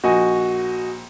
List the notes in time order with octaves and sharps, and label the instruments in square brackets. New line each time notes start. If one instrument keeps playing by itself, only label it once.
[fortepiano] A#1 [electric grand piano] F#4 D#5 G#5